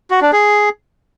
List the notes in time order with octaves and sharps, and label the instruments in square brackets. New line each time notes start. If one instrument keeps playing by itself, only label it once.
[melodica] F#4
D4
G#4